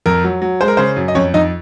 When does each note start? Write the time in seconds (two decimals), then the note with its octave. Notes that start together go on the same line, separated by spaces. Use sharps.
0.06 F2 A#4
0.24 F#3
0.42 F#3
0.61 G#3 C5
0.68 A#4
0.77 C#3 C5
0.96 F#2
1.08 D#5
1.15 F2 C#4 C#5
1.34 F2 D#4 D#5